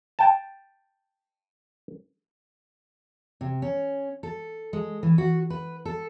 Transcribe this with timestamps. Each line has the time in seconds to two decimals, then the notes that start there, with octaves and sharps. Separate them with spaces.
0.19 G5 A5
3.41 C3
3.62 C#4
4.23 A4
4.73 G#3
5.03 E3
5.18 F#4
5.50 B4
5.85 A4